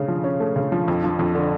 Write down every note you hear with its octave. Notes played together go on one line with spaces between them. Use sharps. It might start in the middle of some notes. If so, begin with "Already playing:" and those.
Already playing: C#3 A3 C#4
F3
C#4
A3
C#3
F3
F2
F3
F2
D3